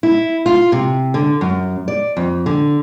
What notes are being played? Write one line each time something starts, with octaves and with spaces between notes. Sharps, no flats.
E4
F4
C3
D3
F#2
D5
F2
D3